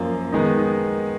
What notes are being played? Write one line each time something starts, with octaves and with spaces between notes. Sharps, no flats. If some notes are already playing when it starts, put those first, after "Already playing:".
Already playing: F#2 F3 A#3 F4
D#3 G#3 B3 D#4